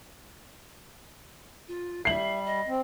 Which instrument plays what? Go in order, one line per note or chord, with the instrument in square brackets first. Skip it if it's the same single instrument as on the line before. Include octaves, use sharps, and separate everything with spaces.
[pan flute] F4
[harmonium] G3 [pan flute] E5 [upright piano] C7 F#7
[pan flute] D#5
[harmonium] C4